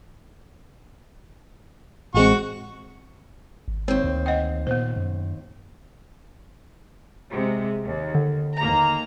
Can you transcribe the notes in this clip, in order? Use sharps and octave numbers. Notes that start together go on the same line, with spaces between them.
A1 G#3 C4 F#4 C#6
G#1
D#2 C4 C#5
D2
D#5 F#5 G5
A#2 B3 C5
F#2
C3 G#3
D#2
D3
D#2 A#3 A#5